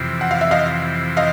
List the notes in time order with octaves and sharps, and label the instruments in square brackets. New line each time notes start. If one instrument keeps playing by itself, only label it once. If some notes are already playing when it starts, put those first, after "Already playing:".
Already playing: [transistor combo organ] F2 C3 E3
[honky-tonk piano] F#5
F5
E5
D#5 F5
D#5 F5